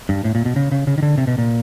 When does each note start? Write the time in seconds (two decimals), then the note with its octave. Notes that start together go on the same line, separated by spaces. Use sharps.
0.09 G2
0.24 A2
0.35 A#2
0.45 B2
0.56 C#3
0.72 C#3
0.87 C#3
0.98 D#3
1.02 D3
1.18 C3
1.27 B2
1.38 A#2